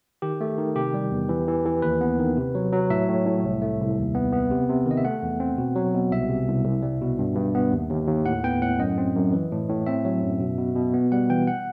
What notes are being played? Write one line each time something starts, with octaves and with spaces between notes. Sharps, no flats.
D#3 G4
A3
D#3
C3 G4
G3
E2
E3
E3
E3
D#2 B4
B3
D#3
C3
F#3
F#3
A2 E5
A2
A2
C2
A3
C2
D#2
B3
B3
C3
C3
D#3 D#5
E5
A3 F#5
E2
C4
B2
F#3
B2
C2 E5
C3
C2
C2
G3
B2
G2
G2
B3
D#2
D#2
D#2
A2 F#5
B3 G5
A2 F#5
F#2 D#5
C4
F#2
E3
A2
A2
C4 E5
F#3
F#2
B2
B2
B2
B3
G3 F#5
E3 G5
F#5